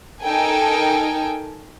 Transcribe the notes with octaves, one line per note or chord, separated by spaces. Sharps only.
D#4 A4 A#4 G5 G#5